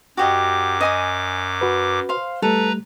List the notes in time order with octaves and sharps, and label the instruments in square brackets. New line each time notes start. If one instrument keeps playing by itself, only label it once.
[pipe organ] F#2 D6 [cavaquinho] F#4 G4 D#5
[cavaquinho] D#5 G#5 D#6
[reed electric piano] F#4 B4
[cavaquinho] C5 F5 C6
[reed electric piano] G3 A3 [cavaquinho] A4 [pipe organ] B4 A#5